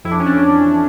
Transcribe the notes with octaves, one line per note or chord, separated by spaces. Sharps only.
F2 E4
D4
C#4
D4
E3